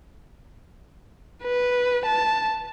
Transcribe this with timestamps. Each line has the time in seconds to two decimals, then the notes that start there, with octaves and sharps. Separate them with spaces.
1.43 B4
2.06 A5